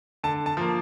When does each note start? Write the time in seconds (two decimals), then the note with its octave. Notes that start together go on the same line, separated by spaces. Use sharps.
0.24 D3 A5
0.46 A5
0.57 F3 A#3